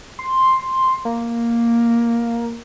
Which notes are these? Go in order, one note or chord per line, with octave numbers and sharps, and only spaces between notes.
C6
A#3